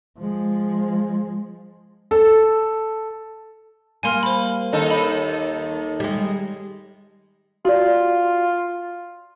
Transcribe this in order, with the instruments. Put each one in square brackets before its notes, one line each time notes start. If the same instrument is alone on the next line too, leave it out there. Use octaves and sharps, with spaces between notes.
[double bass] F3 G#3
[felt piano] A4
[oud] G3 A#3 [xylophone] G#5 C6 F6
[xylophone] C5 B5
[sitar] D#2 D#4 A4
[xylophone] B5
[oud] G3 G#3
[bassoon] F4 [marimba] F#4 D5